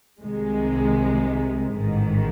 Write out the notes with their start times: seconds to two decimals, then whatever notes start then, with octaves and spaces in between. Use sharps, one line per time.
0.22 C2 C3 D#3 G#3
1.77 A1 G#2 D#3